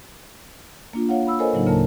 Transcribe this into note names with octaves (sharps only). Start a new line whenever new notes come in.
A#3 D4 F4
F4 C#5 F5 F#5
B5 E6
A4 A#4 C5 C#5 D#5 G#5
A2 C#3 F#3 A#3 D#4
D2 C#3 A#3 A#4 A5